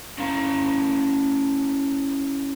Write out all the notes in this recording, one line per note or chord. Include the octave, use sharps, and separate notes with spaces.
C#4 E4 F5 A#5